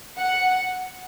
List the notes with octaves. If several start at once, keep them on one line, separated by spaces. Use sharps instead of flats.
F#5